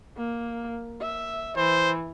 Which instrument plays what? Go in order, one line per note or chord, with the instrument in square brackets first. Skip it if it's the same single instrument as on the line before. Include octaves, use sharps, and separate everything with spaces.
[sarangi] A#3
E5
[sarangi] E3 [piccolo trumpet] C5